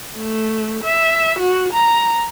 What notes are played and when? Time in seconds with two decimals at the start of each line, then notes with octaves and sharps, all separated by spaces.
0.17 A3
0.84 E5
1.39 F#4
1.73 A#5